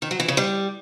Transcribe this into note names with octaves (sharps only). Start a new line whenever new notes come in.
D#3
F#3
E3
C#3
G3